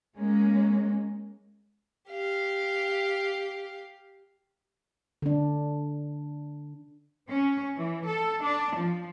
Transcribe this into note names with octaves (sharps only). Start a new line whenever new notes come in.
G#3 A#3 C#4
G4 F5
D3 D4
C#4
E3
A4
D4
F3